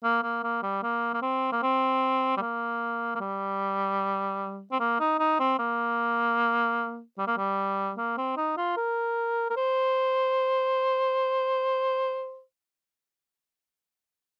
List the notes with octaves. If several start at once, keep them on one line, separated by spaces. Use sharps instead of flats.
A#3
A#3
A#3
G3
A#3
A#3
C4
A#3
C4
G3
A#3
A#3
G3
C4
A#3
D#4
D#4
C4
A#3
G3
A#3
G3
A#3
C4
D#4
F4
A#4
A#4
C5